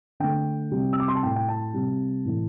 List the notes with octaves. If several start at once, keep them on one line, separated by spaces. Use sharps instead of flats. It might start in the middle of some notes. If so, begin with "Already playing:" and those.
D3 A3 G5
C3 G3
E6
D6
C6
A5
A2 A3 G5
G5
A5
C3 G3
A2 E3 A3